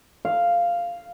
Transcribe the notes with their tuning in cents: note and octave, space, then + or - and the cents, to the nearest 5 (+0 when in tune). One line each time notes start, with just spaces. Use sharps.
F5 -5